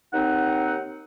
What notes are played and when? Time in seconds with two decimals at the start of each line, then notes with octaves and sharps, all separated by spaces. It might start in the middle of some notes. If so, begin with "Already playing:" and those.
0.12 D#2 C4 D#4 F#5